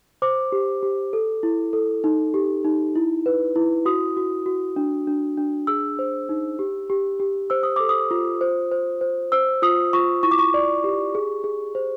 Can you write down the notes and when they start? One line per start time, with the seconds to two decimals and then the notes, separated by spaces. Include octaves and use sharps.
0.22 C5 D6
0.52 G4
0.83 G4
1.13 A4
1.43 E4
1.73 A4
2.04 D#4
2.34 G4
2.64 D#4
2.95 E4
3.26 B4
3.56 E4
3.86 F#4 D#6
4.17 F#4
4.46 F#4
4.76 D4
5.07 D4
5.37 D4
5.67 G#4 E6
5.99 C5
6.29 D#4
6.59 G4
6.90 G4
7.20 G4
7.50 C5 E6
7.63 D#6
7.76 A4 D6
7.89 D#6
8.11 F4
8.41 C5
8.71 C5
9.01 C5
9.32 C5 E6
9.62 F4 D#6
9.93 F4 C#6
10.23 E4 C#6
10.31 D6
10.39 C#6
10.54 D5
10.84 G4
11.15 G#4
11.44 G#4
11.75 C5